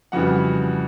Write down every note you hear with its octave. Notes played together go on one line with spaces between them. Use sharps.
F2 C#3 E3 G3 F#4 F#5